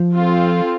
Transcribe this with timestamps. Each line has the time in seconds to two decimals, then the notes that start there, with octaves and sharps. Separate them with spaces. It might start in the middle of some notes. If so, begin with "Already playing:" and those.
Already playing: F3
0.15 C4 F4 A4